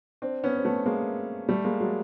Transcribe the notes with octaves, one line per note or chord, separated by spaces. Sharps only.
C4 D4
B3 C#4
C4
A3 B3
G#3 A#3
G3 A3
G#3 A#3
F#3 G#3